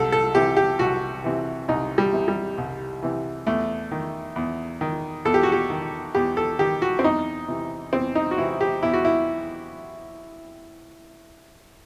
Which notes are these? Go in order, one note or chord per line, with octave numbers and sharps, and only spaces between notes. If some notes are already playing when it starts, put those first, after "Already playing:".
Already playing: C2 A4
A4
C3 E3 G4
G4
C2 F#4
C3 E3
C2 D#4
G3
C3 E3
G3
C2
C3 E3
E2 A3
D#3
E2
D#3
E2 A4
G4
F#4
G4
D#3
E2 G4
A4
D#3 G4
F#4
C4
E2 D#4
C3 E3
E2 C4
D#4
F#4
C3 E3 E4
G4
E2 E4
F#4
E4